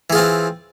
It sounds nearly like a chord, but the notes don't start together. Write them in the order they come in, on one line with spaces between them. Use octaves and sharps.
E3 G#4 F4 C4